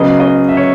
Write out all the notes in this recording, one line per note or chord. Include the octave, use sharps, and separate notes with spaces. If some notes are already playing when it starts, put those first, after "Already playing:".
Already playing: C#3 F#3 B3 D#5
D#5
E5
C#5